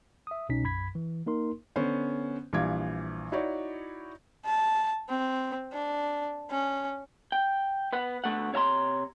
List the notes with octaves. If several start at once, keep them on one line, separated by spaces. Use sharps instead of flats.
E5 D#6
C2 B2 C#4 D#4 B6
B1 F#2 B5 G#6 B6
E3
A#3 D#4 A#4 C6
D3 B3 C#4 C5
A#1 E3 G3 F5 D6 G#6
D#4 E4 F#4 C#5 D5
A5
C4
D4
C#4
G5
B3 B4 F#5
D3 A3 B3 F#5
C3 C#5 E5 A#5 C6